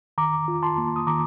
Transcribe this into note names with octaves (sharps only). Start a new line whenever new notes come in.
D#3 A#5 D6
F4
A5 C6
A#3
D#6
D#3 A#5 D6